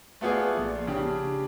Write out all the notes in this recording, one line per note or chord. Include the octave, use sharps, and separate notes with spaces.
A3 B3 F4 G#4 D5
A#1
C#3 D4 G4